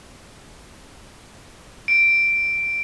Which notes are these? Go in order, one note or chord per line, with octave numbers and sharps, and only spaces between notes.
D7